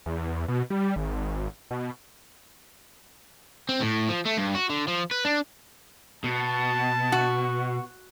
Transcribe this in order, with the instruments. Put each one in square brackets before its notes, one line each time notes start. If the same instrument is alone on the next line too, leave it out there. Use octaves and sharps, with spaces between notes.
[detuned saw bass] E2
B2
G3
G#1
B2
[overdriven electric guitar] C4
A2
F3
A3
G2
F#4
D3
F3
B4
D4
[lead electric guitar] B2 [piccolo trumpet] A5
[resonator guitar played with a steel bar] F#4